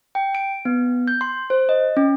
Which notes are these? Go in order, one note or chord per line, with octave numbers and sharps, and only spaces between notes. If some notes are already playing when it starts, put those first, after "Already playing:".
G5
D7
B3
G6
C6
C5
D#5
C#4